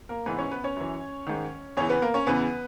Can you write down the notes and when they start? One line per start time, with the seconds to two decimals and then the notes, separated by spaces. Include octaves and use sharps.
0.09 A#3 A#4
0.26 G#2 E3 B3 B4
0.38 C#4 C#5
0.51 B3 B4
0.64 C#4 C#5
0.76 F#2 E3
1.27 G#2 D#3
1.77 E2 C#3 E3 C#4 C#5
1.90 B3 B4
2.02 A#3 A#4
2.14 C#4 C#5
2.27 E2 C#3 E3 B3 B4